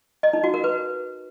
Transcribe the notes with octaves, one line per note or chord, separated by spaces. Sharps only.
D#5
D#4
F#4
A#4
B4